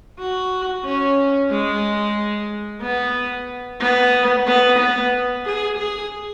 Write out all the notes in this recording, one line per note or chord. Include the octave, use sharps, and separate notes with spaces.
F#4
C#4
G#3
B3
B3
B3
B3
G#4
G#4